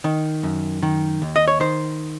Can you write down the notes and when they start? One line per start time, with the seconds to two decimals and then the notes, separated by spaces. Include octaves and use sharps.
0.04 D#3
0.43 F#2
0.83 D#3
1.22 D#2
1.36 D#5
1.48 C#5
1.60 D#3 C5